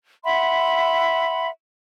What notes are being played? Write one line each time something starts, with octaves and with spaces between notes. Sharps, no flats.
E5 F#5 B5 C6